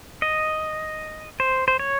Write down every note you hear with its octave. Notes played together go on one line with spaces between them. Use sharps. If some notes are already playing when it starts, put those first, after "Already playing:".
D#5
C5
C5
C#5